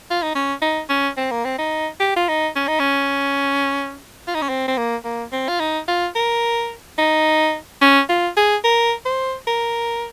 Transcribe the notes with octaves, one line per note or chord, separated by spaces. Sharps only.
F4
D#4
C#4
D#4
C#4
C4
A#3
C4
D#4
G4
F4
D#4
C#4
D#4
C#4
F4
D#4
C#4
C4
C4
A#3
A#3
C4
F4
D#4
F4
A#4
D#4
C#4
F4
G#4
A#4
C5
A#4